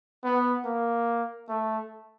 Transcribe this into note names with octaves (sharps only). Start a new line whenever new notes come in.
B3
A#3
A3